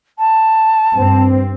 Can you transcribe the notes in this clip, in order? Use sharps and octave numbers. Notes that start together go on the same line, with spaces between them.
A5
G2 C4